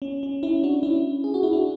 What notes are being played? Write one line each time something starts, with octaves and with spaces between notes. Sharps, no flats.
C#4
C#4
C#4 E4
D4 F#4
C#4 E4
G#4
F#4
E4
D4 F#4